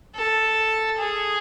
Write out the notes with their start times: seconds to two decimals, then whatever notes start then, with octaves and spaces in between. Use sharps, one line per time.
0.16 A4
0.98 G#4